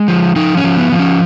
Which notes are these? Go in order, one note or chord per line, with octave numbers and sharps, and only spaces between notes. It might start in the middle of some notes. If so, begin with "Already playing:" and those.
Already playing: G#3
F3
F3 D#4
C#4
F3
B3
F3
C#4